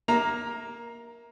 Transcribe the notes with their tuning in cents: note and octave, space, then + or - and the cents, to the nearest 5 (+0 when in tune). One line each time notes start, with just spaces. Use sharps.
A#3 +10 E5 -20 A#5 +5